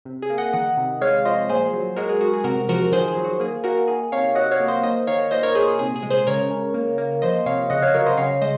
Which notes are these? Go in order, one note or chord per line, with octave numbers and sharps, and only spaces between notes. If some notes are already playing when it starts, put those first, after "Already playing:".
C3
G#4
A#3
D#5 F#5
D#3 D#5 F#5
C3
G#3 C#5 F5
F3 C5 D#5
A#2 G#4 C5
F#3
G#3 F#4 A#4
G#4
G#3 F#4
G#4
C3 F#4 A#4
F3 F#4 A#4
D#3 G#4 C5
G#4
F#3
F#4
A#3 G#4
A#3 F#4 A#4
D#3 G#4
C3 C#5 F5
F#3 D#5 F#5
C#5 F5
A#3
C5 D#5
D#3 C5 D#5
D#3 C#5 F5
A#2 C5 D#5
A#4 C#5
A#2 G#4 C5
G#4
C3 G#4
G#4
G#3
G#4 C5
C#3 A#4 C#5
C#3
A#3
A#3
F3 C5 D#5
C3 C#5 F5
C#3 D#5 F#5
C#5 F5
F#3 A#4 C#5
C5 D#5
C#3 C#5 F5
G#3 C5 D#5